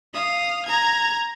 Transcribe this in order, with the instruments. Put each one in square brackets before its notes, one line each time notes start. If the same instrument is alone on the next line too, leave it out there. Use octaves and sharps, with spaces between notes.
[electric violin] F5 D#6
A#5 G#6